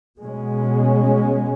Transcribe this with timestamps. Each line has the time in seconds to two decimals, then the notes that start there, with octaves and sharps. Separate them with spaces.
0.19 B2 G#3 C#4